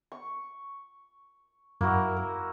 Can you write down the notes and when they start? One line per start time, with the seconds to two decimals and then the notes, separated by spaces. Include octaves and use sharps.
0.12 C#6
1.81 F#2 A#3 E4 F#4
2.16 A#4